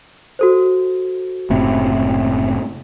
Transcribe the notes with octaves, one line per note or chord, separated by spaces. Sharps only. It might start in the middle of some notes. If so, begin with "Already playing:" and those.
F#4 A4 C5
F#1 A2 C3